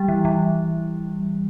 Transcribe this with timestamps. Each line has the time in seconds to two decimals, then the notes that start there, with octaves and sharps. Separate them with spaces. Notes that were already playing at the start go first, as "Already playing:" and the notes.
Already playing: G3
0.08 E3
0.25 E3